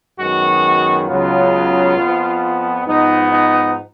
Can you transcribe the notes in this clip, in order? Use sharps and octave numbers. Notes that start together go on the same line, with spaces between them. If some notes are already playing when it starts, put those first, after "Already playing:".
F#2 D#3 G#3 B3 F#4
C#2 C#3 F#3 B3 F4
F2 F3 B3
G#2 F3 B3 D#4
D#4